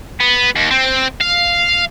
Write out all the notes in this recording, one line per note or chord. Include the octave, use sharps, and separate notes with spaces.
B3
D#2
C4
F5